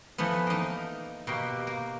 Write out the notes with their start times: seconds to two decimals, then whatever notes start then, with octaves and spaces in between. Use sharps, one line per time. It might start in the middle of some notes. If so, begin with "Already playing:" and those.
0.18 E3 F3 A3 B3
0.47 A#3 D#4
1.27 B2 A#3 G4
1.67 A#3